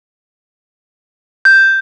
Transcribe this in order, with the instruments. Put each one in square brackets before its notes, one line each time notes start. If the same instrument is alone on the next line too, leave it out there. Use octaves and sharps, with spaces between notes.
[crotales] G6